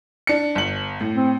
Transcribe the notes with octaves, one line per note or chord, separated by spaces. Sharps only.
D4 C#7
G1 F#7
A2
C4